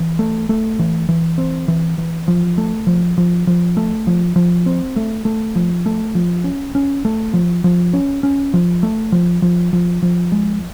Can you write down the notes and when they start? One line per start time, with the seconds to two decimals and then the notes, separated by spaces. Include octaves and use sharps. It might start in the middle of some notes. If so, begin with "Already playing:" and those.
Already playing: E3
0.19 A3
0.49 A3
0.79 E3
1.09 E3
1.38 C4
1.68 E3
1.98 E3
2.28 F3
2.58 A3
2.87 F3
3.18 F3
3.47 F3
3.77 A3
4.07 F3
4.36 F3
4.66 C4
4.96 A3
5.25 A3
5.56 F3
5.86 A3
6.15 F3
6.44 C#4
6.75 C#4
7.05 A3
7.34 F3
7.64 F3
7.93 C#4
8.23 C#4
8.54 F3
8.83 A3
9.12 F3
9.42 F3
9.73 F3
10.02 F3
10.32 G#3